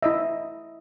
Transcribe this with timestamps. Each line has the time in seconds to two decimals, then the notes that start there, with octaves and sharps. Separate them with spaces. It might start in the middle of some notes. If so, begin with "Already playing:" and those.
0.03 E4 D#5 E5